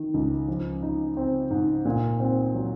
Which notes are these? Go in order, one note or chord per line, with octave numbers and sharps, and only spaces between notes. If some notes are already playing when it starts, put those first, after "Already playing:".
Already playing: D#3
C#2
F3
D#4
C4
G#2
A#2
C4
F#3